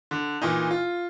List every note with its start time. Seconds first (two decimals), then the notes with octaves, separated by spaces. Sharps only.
0.11 D3
0.42 A#2 E3 D#4
0.71 F4